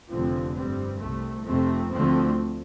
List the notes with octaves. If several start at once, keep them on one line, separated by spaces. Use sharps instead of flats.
F1 F2 D3 F3 C4
G2 G3 C4
C2 C3 A3
F1 F2 C3 A3 C4
D2 D3 F3 A3 C4